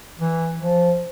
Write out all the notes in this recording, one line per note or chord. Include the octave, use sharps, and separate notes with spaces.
E3
F3